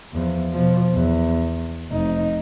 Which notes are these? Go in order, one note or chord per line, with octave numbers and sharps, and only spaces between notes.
E2 F3
B2 F3
E2
F1 D#4